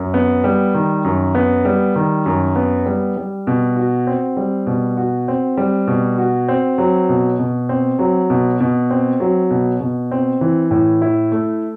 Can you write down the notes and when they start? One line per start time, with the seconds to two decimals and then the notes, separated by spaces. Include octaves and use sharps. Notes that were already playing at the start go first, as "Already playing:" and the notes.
Already playing: F#2
0.14 B3
0.44 G3
0.74 D#3
1.04 F#2
1.35 B3
1.65 G3
1.96 D#3
2.26 F#2
2.56 B3
2.86 G3
3.16 G3
3.47 B2
3.76 F#4
4.07 C4
4.37 G3
4.67 B2
4.97 F#4
5.28 C4
5.57 G3
5.87 B2
6.18 F#4
6.48 C4
6.78 F#3
7.09 B2
7.39 B2
7.69 C4
7.99 F#3
8.30 B2
8.60 B2
8.90 C4
9.20 F#3
9.51 B2
9.80 B2
10.11 C4
10.41 E3
10.71 A2
11.02 E4
11.32 A3